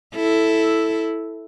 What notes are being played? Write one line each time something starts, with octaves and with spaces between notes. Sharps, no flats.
E4 A4